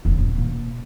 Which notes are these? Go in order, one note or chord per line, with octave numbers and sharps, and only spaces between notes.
F1 C#3
D#1 A#1
B2 A#3